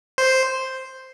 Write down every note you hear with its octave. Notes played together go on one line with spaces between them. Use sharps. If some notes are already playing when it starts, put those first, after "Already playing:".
C5